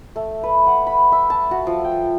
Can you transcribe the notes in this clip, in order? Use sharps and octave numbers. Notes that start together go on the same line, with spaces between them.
A3
B4
F#5
B5
E5
A5
F#4
F3
G5